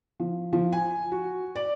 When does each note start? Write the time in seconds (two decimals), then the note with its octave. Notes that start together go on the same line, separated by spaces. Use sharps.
0.20 F3
0.53 F3
0.73 G#5
1.12 F#4
1.55 D5